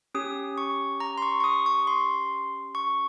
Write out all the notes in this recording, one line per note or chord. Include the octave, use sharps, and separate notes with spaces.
C#4 G4 D#6
C#6
A#5
C6
C#6
C#6
D#6
C#6
C6
C#6